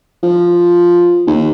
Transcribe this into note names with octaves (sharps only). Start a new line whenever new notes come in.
F3
D#2